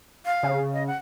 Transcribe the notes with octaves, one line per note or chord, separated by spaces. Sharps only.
F5
C#3
D#5
F#5